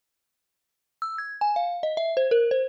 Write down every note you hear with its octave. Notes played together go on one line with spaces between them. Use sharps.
E6
G#6
G#5
F5
D#5
E5
C5
A#4
C5